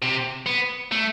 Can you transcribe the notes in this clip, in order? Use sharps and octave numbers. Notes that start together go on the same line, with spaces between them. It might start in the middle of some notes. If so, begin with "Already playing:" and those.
C3
B3
A3